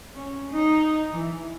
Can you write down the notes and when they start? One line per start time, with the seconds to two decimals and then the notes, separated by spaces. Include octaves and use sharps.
0.13 C#4
0.52 D#4
1.12 E3